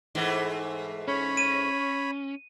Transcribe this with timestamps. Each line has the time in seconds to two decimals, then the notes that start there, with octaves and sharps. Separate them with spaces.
0.15 G#2 E3 A3
1.08 C#4 C#5 B5
1.37 D#7